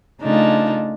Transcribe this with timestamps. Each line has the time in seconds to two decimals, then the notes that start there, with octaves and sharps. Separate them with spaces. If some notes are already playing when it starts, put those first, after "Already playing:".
0.22 C#3 A3 D4 D#4 F4